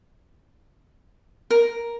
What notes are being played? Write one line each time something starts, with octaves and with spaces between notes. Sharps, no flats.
A#4